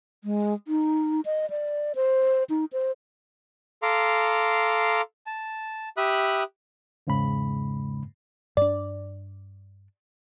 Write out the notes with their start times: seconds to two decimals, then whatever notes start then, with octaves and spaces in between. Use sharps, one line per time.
0.24 G#3
0.68 D#4
1.25 D#5
1.50 D5
1.95 C5
2.50 D#4
2.73 C5
3.83 A4 F5 A#5 C6 D6
5.27 A5
5.97 G4 E5 B5 D#6 F#6
7.07 E2 G#2 C#3 G#3 B5
8.57 G2 D4 D5